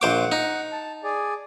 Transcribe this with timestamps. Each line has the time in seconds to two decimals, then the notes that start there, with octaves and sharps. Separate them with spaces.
0.02 A#1 C5 F#5 D6
0.32 D#4
0.72 A5
1.03 G#4 D5